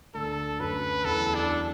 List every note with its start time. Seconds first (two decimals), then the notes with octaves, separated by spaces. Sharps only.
0.14 D2 D3 A4
0.60 F#2 F#3 B4
1.04 E2 E3 A4
1.35 D4